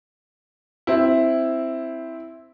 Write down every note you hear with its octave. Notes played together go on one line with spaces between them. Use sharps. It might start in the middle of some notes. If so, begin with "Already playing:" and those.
C4 E4